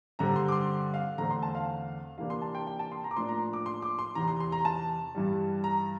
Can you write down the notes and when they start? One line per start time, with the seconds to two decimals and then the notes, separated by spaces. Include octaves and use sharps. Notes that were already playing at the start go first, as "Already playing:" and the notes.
0.19 G2 D3 G3 C4 A#5
0.36 C6
0.48 D6
0.52 C6
0.94 F5
1.18 E2 D3 A3 C4 A#5
1.30 C6
1.43 A5
1.55 F5
2.18 C3 E3 A#3 D4 F5
2.30 C6
2.42 A5
2.55 G5
2.67 G5
2.79 A5
2.92 C6
3.04 A#5
3.11 D6
3.16 A2 F3 A#3 D4 C6
3.29 A#5
3.53 D6
3.66 C6
3.82 D6
3.99 C6
4.15 E2 C3 E3 A#5
4.28 C6
4.40 C6
4.52 A#5
4.65 A5
5.15 G2 E3 G3
5.64 A#5